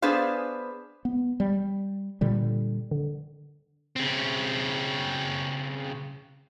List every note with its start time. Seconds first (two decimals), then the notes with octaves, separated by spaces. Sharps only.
0.02 B3 D4 G#4 B4 C5 F5
1.05 B3
1.40 G3
2.21 A#2 D3 G3
2.91 D3
3.96 C#3 C4